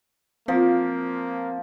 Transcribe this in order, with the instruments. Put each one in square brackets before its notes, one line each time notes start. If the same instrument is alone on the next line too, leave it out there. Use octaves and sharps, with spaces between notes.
[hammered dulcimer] F3 [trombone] A#3 [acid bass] C4